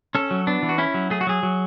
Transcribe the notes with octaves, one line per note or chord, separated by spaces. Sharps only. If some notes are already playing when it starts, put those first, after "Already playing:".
C#4 A4
F#3
B3 D4
E3
F#4
C#4 E4
F#3
A3 G#4
F#4
F#3 G#4
F#3